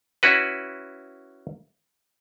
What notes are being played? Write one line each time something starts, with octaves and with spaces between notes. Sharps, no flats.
C#4 E4 F#4 B4